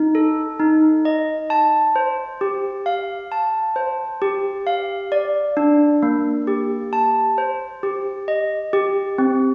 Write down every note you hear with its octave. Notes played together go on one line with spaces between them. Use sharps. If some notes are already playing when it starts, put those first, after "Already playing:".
Already playing: D#4
A4
D#4
D#5
A5
C5
G4
F5
A5
C5
G4
F5
D5
D4
A#3
G4
A5
C5
G4
D#5
G4
C4